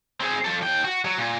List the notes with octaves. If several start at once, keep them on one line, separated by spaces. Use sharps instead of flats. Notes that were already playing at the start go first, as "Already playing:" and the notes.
C4 G#4
F3 A4
D#2 G5
F#4
F#3
A#2